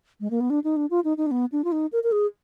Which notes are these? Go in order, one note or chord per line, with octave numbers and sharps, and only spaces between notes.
G#3
A#3
B3
D4
D#4
D4
F4
D#4
D#4
D4
B3
D4
F4
D#4
A#4
A#4
G#4